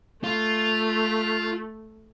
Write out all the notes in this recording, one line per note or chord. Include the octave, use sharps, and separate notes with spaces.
A3 F4